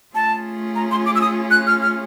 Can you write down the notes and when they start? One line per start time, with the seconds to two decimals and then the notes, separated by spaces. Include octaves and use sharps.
0.15 A3 C#4 F4 G#4 A5
0.75 A#5
0.91 C6
1.06 D6
1.15 E6
1.21 D#6
1.51 F#6
1.67 F6
1.82 F6